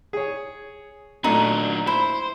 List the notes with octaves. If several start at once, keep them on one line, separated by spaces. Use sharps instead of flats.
G#4 C#5
A#2 F#3 A3 D4 D#4
E4 C5